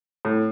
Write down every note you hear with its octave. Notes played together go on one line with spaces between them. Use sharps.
A2